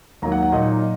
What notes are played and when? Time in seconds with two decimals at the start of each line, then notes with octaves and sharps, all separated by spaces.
0.22 D#2 D#3 F#3 A#3 A#5
0.32 F#5
0.43 F#5
0.52 A#2 F#3 A#3 D#4 D#5